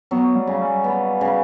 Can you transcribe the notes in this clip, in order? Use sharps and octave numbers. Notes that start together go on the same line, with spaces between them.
F#3 B3
G3
C#3
G3
B3
C#3